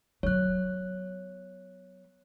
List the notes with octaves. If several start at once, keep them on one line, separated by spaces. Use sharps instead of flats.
F#3 B3 C#5 F#6